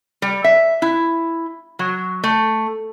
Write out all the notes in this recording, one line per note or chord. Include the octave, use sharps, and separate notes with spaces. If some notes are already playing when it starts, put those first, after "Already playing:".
G3
E5
E4
F#3
A3